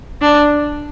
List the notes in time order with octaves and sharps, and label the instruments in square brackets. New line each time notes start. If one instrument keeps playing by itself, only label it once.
[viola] D4